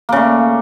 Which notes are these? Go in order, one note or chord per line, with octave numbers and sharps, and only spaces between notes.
C#3 A3 A#3